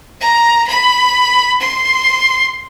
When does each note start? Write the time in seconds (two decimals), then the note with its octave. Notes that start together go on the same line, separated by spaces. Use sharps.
0.20 A#5
0.68 B5
1.60 C6